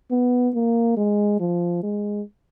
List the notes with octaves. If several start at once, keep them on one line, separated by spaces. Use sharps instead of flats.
B3
A#3
G#3
F3
G#3